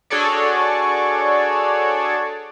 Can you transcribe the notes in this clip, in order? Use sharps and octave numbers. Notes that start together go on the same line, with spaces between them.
D4 F#4 G#4 A4 C#5 D5